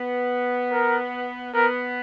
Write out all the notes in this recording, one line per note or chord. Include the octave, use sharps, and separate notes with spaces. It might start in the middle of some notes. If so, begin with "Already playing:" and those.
Already playing: B3
A#4
B3 A#4